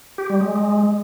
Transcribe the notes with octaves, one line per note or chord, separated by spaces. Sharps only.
G4
G3
G#3